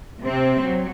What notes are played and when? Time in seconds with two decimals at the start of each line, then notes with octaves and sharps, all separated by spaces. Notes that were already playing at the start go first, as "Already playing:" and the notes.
0.21 C3 C4
0.61 F#3